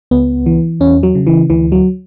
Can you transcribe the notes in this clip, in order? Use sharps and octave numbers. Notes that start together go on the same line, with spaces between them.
C#2 B3
E3
E2 C#4
F#3
C#3
E3
D2 E3
F#3